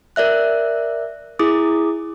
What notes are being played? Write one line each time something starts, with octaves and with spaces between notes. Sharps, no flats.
A#4 D5 E5 F#6
E4 G#4 D6 D#6